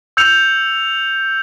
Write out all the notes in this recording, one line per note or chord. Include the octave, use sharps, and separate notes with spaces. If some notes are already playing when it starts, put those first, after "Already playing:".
E6 G6 C#7 F7